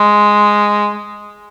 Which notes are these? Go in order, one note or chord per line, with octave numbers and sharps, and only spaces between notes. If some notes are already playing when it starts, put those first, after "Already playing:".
Already playing: G#3